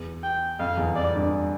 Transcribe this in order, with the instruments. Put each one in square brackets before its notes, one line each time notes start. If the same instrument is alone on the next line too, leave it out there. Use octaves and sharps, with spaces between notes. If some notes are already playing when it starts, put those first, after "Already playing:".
Already playing: [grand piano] E2
[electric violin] G5
[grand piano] F2 [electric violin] F5
[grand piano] E2
[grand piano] F2 [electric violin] D5
[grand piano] G2